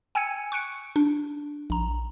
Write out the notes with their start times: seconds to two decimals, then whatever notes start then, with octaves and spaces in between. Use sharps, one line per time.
0.15 G5 G#5 E6 G#6 C#7 D#7
0.52 C#6 F#6 C#7 D7
0.96 D4
1.70 A#1 A#5